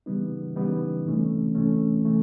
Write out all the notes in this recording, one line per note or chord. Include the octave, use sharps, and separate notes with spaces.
C#3 E3 G3 B3 D#4
C#3 E3 G3 B3 D#4
C2 C3 E3 A3 C#4
C2 C3 E3 A3 C#4
E3 A3